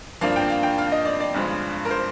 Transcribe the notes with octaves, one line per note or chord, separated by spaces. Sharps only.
G2 F3 A#3 D4 F5
G5
F5
G5
F5
D#5
D5
D5
G1 G2 F3 G#3
A#4
C5